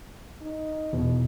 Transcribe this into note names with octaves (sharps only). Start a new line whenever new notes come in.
D#4
E2 B2